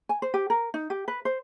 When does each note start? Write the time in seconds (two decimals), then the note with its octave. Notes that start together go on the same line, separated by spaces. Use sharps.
0.09 G#5
0.22 C5
0.34 G4
0.50 A#4
0.74 D#4
0.90 G4
1.08 B4
1.25 C5